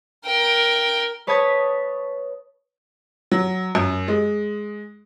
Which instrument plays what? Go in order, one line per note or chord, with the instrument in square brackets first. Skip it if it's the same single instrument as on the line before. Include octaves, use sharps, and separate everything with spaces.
[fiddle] A#4 G5
[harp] B4 C#5 A5 B5 D#6 G#6
[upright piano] F#3
F#2
G#3